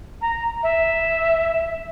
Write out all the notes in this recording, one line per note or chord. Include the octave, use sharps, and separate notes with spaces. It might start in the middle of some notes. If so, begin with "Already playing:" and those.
A#5
E5